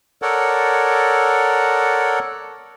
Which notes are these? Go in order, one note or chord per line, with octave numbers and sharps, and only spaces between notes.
A4 A#4 C#5 D5 F#5